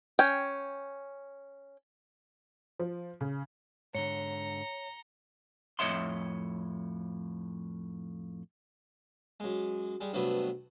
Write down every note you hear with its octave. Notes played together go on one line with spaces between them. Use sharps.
C#4 G5
F3
C#3
G#2 D3 C#5 A#5 C#7 G7
F2 A2 C#5 D#5 E5 C6
F#2 G#3
G3 G#3
G2 C3 F#3 A3 B3